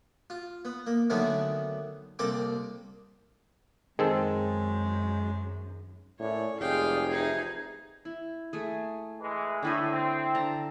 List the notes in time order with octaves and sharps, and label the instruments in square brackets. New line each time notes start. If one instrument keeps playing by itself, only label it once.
[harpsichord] F4
B3
A#3
D3 D#3 F#3 A3 B3 C#4
C2 A#3 C4 A4 C6 D6
[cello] F#2 [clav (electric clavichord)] D#3 C4 A4 [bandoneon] G#3 [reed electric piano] G#4
[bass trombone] A2 [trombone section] A#3 C#4 E4 [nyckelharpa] C#5 [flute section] D5
[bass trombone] F1 [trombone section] G#3 [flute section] G#4 D5 [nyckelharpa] F5 G5
[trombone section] E2 C3 E4 [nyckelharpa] D#4 G#4 [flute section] G#6
[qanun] E4
A3 G#4
[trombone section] E3 G#3
[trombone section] A2 [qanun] D3 E4 D#5
[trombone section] C4
[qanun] D3 A5 A#5